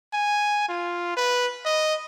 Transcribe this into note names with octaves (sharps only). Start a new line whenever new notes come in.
G#5
F4
B4
D#5